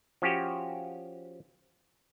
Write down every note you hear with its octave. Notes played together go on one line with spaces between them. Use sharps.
F3 C#4 F#4 G4